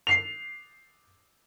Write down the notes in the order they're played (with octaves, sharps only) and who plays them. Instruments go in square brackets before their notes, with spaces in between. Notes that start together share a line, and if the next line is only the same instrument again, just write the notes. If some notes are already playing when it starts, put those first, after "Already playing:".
[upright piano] C7 F7